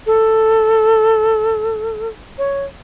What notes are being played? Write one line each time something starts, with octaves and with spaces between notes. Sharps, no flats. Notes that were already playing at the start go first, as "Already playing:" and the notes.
A4
C#5